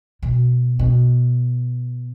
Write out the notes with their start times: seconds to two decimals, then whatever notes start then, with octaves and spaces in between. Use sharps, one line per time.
0.22 B2
0.79 B2